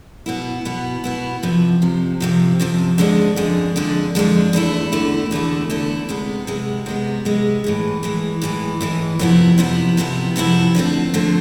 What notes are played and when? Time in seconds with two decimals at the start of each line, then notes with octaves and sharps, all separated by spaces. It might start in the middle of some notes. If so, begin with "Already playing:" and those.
0.26 B2 B3 E4
0.65 B2 B3 E4
1.04 B2 B3 E4
1.43 F2 C3 F3
1.82 F2 C3 F3
2.20 F2 C3 F3
2.60 F2 C3 F3
2.98 F2 D3 G#3 D4
3.36 F2 D3 G#3 D4
3.76 F2 D3 G#3 D4
4.15 F2 D3 G#3 D4
4.53 E2 D3 A3 E4
4.92 E2 D3 A3 E4
5.31 E2 D3 A3 E4
5.70 E2 D3 A3 E4
6.09 C3 G#3 B3
6.47 C3 G#3 B3
6.86 C3 G#3 B3
7.25 C3 G#3 B3
7.64 A2 E3 G#3
8.03 A2 E3 G#3
8.42 A2 E3 G#3
8.81 A2 E3 G#3
9.19 F2 C3 F3 B3 E4
9.58 F2 C3 F3 B3 E4
9.97 F2 C3 F3 B3 E4
10.36 F2 C3 F3 B3 E4
10.75 D3 F3 A3 C4
11.14 D3 F3 A3 C4